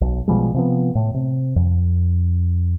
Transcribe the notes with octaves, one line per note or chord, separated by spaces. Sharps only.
B1
B2 F3 G3 G#3
C3 F3 B3
A2
C3
F2